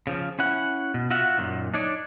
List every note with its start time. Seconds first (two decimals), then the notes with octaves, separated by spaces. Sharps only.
0.07 C#3 F3
0.39 C#4 E4 F#5
0.94 B2
1.10 F4 F#4 E5 F#5
1.37 F#2 A#2 D#3
1.74 D4 D#4 C#5 D5